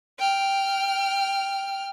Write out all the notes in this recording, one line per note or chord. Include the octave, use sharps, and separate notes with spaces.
G5 F6